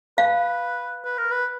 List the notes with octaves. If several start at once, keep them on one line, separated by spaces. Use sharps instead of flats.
B4 F5
B4
A#4
B4